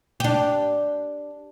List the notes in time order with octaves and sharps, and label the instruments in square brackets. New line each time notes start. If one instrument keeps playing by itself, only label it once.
[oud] D4 G4